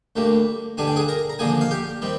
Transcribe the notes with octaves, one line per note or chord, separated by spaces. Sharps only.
D2 D3 G3 A#3
G2 D3 G3 D4 G#5
G5
G#4 G#5
A#4 A#5
A#5
D#2 D3 F3 A#3 G#4 G#5
F5
G4 G5
D#3 G3 C4